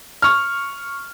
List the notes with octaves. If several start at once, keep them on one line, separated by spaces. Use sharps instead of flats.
C#6 F6